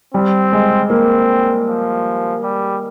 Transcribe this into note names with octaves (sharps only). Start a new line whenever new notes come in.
G3 C4
G#3
A#3 C4
F3
G3